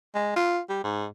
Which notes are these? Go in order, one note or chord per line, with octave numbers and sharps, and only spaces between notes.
G#3
F4
G3
G#2